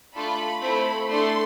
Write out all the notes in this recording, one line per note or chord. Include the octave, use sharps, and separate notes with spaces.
A3 D4 F4 A4 B5
A3 C4 E4
A3 D4 A4 C6